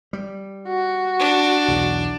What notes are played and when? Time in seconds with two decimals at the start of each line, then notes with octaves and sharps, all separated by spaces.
0.13 G3
0.69 F#4
1.19 D4
1.68 B1 E2